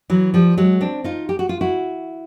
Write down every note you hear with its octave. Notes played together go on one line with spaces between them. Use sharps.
E3 F#3
F3 G3
F#3 G#3
C4 D4
D#4 F4
G4
F#4
F4
E4 F#4